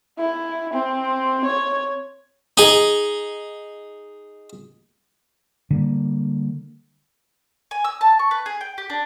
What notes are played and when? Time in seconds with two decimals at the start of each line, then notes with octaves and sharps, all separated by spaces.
0.18 E4
0.73 C4
1.45 C#5
2.58 D#4 G#4
5.70 D3 G3 A#3
7.71 G#5
7.84 E6
8.01 A5
8.19 C#6
8.31 B4
8.46 G#4
8.61 G5
8.78 G4
8.90 D4